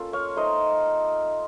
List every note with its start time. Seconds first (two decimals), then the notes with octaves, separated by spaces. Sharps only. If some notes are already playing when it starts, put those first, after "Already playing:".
Already playing: A#3 C#4 F4 A4
0.13 C#5 F5
0.36 A3 D#4 C5 D#5